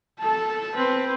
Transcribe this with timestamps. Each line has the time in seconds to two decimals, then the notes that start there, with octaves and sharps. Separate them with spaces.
0.19 A4 A5
0.76 C4 B4